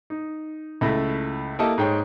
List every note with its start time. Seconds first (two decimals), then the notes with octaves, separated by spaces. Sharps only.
0.10 D#4
0.81 C#2 A3 E4 B5 A#6
1.59 A#3 E4 G4 A4 D#5 A5
1.78 G#2 D#4 G#4 C#5 G5